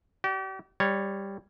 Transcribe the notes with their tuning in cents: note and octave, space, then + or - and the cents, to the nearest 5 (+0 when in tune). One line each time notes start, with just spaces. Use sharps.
G4 -40 D5 +0
G3 +10 C#5 +0